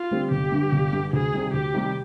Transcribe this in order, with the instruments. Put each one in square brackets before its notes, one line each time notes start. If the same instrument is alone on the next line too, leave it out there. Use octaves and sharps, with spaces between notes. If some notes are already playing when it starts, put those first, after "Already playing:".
Already playing: [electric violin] F4
[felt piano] D3 G3 C4 G4
[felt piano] G1 [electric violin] G4
[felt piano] G2 D3
G1
G2 D3
[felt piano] D2 [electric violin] G#4
[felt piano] C3 D#3 G3
[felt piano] D2 [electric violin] G4
[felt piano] C3 D#3 G3